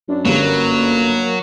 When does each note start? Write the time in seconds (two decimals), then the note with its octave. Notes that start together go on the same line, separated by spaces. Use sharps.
0.09 F#2 D4
0.25 G1 F#3 A#3 G4